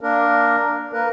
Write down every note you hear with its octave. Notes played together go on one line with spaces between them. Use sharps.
A#3 D4 A#4
A#3 A#4 B4